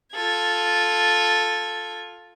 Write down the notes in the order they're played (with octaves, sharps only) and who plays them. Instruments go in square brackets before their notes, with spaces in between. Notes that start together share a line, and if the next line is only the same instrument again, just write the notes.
[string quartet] F4 A4 G#6